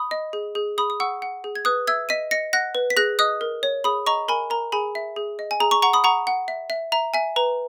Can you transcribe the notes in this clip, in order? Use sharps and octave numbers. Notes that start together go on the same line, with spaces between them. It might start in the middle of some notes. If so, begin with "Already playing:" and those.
Already playing: B5 D#6
D#5
G#4
G#4
G#4 B5 D#6
D#6
F#5 C#6 E6
F#5
G#4
G#6
B4 D#6 F#6
E5 E6 G#6
D#5 B6 D#7
D#5 A#6 C#7
F#5 F#6 A#6
B4
B6
G#4 F#6 A#6
D#5 D#6 F#6
A#4
C#5
G#4 B5 D#6
D#5 A#5 C#6
A#4 G#5 B5
A#4 A#5
G#4 G#5 B5
E5
G#4
D#5
G#5
G#4 A#5
A#5 C#6
F#5 A#5 C#6
B5 D#6
F#5 A#5 C#6
F#5
E5
E5
E5 A#5
E5 G#5
B4 A#5